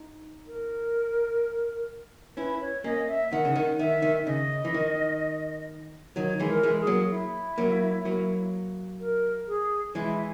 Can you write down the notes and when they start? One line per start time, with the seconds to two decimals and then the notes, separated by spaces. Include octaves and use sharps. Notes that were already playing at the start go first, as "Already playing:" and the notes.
Already playing: D#4
0.47 A#4
2.37 C#4 E4 B4
2.61 C#5
2.84 A#3 C#4 D#5
3.08 E5
3.32 D#3 F#5
3.45 C#3
3.56 D#3
3.79 D#3 E5
4.02 D#3
4.26 C#3 D#5
4.65 E3
4.74 D#3
6.16 D#3 F#3 C#5
6.40 E3 G#3
6.48 A#4
6.63 E3 G#3
6.80 G#4
6.87 F#3 A#3
7.11 E4
7.58 F#3 A#3
8.05 F#3 A#3
9.00 A#4
9.47 G#4
9.95 E3 G#3 E4